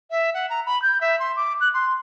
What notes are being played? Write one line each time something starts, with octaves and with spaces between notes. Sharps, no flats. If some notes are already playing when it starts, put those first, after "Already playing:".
E5
F#5
A#5
B5
G6
E5
C6
D6
F#6
C6